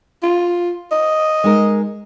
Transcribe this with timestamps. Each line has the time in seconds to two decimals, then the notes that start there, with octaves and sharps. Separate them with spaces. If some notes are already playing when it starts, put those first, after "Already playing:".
0.23 F4
0.91 D#5
1.44 G#3 D#4 A#4